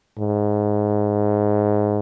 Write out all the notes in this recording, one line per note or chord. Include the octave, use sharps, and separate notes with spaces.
G#2